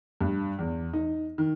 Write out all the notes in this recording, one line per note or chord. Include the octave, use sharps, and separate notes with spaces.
G2
E2
D#4
D#3